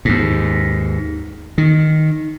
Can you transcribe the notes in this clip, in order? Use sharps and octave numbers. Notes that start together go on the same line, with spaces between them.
D#2 G#2
D#3